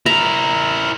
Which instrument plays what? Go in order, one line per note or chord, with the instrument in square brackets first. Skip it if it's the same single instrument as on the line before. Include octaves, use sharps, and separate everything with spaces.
[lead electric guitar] E4 A#4 [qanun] A#5